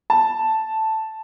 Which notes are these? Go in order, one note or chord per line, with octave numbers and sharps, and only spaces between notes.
A5